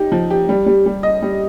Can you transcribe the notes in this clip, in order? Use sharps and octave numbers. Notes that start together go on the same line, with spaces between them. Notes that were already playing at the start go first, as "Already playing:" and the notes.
Already playing: D#4 G4
F3
G4
G3
G3
G3
D#5
G3